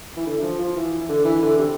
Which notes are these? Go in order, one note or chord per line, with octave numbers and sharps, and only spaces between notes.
E3
D3
F3
F3
E3
D3
E3
D3
C3